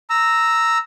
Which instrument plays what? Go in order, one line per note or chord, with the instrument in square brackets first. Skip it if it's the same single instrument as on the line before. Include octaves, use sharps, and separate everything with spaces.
[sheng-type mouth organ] A#5 E6